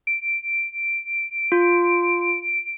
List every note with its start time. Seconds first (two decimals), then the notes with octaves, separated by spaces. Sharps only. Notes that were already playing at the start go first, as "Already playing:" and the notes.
0.07 D7
1.52 F4